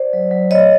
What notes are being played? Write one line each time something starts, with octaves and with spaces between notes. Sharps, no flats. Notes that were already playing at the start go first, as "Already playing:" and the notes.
Already playing: C5 D5
F#3
F#3
A3 C#5 D#5